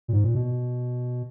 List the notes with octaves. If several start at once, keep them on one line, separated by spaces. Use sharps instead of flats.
A#2
G#2
A#2
B2